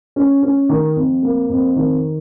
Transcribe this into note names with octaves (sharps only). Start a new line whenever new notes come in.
C#4
C#4
D#3
F2
A#3
F2
D#3